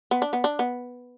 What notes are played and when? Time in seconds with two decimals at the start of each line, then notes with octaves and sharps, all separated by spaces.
0.11 B3
0.22 D4
0.33 B3
0.44 D4
0.59 B3